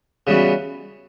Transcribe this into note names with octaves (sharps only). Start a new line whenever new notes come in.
C#3 E3 G3 B3 F#4